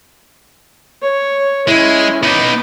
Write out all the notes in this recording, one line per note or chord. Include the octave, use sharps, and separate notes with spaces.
C#5
G#3 C#4 E4
B3 D#4 D6